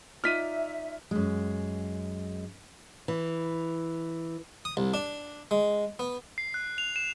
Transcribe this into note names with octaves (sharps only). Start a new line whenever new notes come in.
D#4 F4 D5 E5 F6 B6 D#7
F#2 G#3
E3
D#6
C2
D4
G#3
B3
C7
F#6
F7
E7